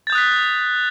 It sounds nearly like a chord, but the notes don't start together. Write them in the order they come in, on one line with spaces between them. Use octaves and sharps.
A6 G6 D#6 F#6 B6